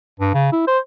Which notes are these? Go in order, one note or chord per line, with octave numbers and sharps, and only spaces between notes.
G2
C#3
E4
C5